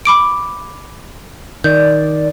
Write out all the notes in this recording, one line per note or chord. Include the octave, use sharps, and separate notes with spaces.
B5 D6 D7
D#3 D5 G6